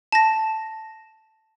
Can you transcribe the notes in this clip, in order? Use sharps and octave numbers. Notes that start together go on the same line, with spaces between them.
A5 A#6